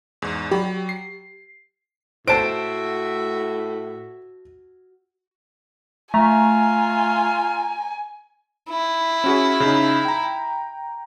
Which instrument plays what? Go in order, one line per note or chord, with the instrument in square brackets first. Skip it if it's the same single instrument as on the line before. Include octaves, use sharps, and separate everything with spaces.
[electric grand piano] E2 G#2
[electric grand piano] F#3 D5 B5 [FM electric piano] G4
[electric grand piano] C7
[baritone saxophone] A2 [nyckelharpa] F#4 E5 [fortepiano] C5 A5 [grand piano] D7
[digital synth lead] A3 [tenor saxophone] F4 [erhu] G#5 [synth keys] A#5
[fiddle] E4
[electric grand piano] C#4 F#4 G#4
C#3 D#4
G5 A#5